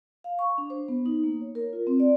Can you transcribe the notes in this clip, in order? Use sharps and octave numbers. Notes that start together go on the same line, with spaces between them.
F5
C#6
D4
C5
B3
D#4
A#3
C#5
A#4
F4
C4
D5